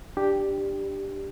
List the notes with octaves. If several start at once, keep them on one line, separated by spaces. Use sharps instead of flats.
D4 G4